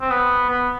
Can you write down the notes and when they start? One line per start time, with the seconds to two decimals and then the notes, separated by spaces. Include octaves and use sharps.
0.01 C4
0.10 B3
0.49 B3